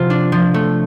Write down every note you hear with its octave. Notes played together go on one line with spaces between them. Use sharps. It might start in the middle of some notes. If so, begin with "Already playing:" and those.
Already playing: C3 F3 F4
D4
F3
A3